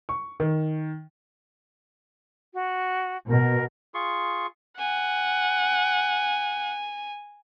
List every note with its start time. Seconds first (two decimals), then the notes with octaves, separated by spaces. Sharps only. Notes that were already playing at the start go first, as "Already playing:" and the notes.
0.09 C#6
0.40 D#3
2.54 F#4
3.28 B2 A#4
3.94 F4 G#4 C6 C#6
4.78 F#5 G#5